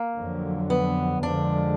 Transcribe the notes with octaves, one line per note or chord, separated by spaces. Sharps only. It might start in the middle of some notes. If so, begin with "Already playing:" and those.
Already playing: A#3
F2 D3 F#3
B3
F2 D3 F3 G#3 D4